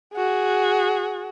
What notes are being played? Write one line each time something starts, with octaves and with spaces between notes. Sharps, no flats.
F#4 G#4